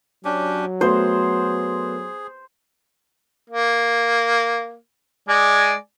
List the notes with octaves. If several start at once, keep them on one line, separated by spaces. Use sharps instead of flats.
F#3 C#4 D4 G4
A3 B3 F#4 G#4 C5
A#3
G#3 D5 G#5